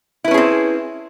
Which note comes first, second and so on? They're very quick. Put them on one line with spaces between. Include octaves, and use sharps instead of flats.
E4 B4 C#4 G#4 C4